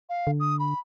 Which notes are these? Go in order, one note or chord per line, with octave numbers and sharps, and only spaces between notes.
F5
D3
D#6
B5